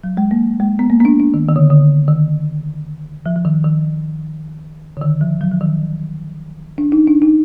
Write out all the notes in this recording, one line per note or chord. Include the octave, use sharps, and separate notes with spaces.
F#3
G#3
A#3
G#3
B3
A#3
B3
D4
D4
D#3
D#3
D3
D3
D#3
F3
F3
D#3
D#3
D3
D#3
F3
F#3
F3
D#3
D4
D#4
D4
D#4